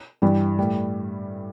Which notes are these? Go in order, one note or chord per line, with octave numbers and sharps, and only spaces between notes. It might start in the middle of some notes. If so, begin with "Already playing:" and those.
G2 E3 G3
A2 G3